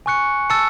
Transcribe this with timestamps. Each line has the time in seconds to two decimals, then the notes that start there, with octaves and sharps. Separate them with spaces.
0.06 G#5 C#6 F#6 C#7
0.50 A5 E6 A6 C#7